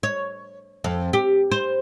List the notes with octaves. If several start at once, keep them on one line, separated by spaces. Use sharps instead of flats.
C#5
F2
G4
C5